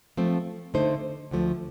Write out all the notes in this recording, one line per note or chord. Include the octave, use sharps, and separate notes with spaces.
F3 A3 C4
D3 A3 D#4 A4 C5
D2 D3 F3 A3